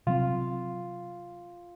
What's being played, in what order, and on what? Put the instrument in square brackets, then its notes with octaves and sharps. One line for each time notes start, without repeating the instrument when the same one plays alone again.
[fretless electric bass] C3 F#3 C4 [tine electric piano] F4